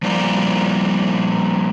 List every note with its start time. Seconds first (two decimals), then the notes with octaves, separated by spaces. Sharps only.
0.03 F3 G3 A#3 F4 D5